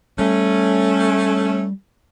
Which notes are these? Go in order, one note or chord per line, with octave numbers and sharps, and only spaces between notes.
G3 A3 C#4